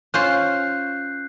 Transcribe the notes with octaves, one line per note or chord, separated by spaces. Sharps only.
C#4 F4 C5 F#6 G6 C7